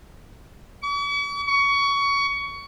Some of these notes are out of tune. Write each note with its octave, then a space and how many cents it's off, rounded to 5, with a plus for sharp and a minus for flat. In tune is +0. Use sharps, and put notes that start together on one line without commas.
C#6 +45
C#6 +20